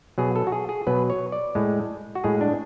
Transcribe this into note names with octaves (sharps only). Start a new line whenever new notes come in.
B2 F#3 G#4
A4
F#4
G#4
G#4
B2 F#3 B4
C#5
D5
A2 G#3
F#4
A2 G#3 G#4
D4